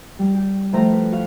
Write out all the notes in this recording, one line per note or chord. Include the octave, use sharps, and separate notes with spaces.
G3
G4
A2 F3 C5 A#5 F6
B4
F#4 F5